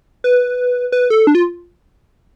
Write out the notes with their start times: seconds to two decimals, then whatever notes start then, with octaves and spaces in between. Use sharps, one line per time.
0.24 B4
0.92 B4
1.10 A4
1.27 D4
1.35 F4